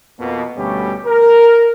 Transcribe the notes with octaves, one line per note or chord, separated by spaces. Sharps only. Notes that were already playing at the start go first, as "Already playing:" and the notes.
F2 B2 A#3
D2 B2 G3 A3 C#4 G4
A#4